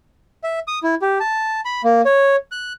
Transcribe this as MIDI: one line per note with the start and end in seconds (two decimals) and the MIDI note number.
0.44 0.59 76
0.68 0.79 87
0.83 0.95 64
1.02 1.19 67
1.20 1.61 81
1.65 1.82 83
1.84 2.01 58
2.05 2.36 73
2.52 2.73 90